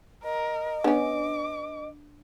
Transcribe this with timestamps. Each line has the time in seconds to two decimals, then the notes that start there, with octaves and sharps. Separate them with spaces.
0.24 A#4 D#5
0.84 B3 C#4 D4 D6